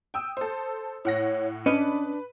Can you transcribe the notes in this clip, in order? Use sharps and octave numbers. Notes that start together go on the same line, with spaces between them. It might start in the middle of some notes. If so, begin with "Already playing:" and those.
G5 D#6 E6
A4 C5
A2 C#5 F#5 A#6
C#4 D4 B4 D#5